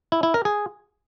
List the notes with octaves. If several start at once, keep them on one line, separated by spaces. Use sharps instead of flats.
E4
E4
A#4
G#4